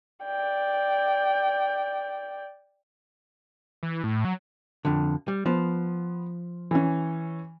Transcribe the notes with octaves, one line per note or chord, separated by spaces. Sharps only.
D5 G5
E3
A2
F#3
F2 D3
G3
F3 B3
E3 C#4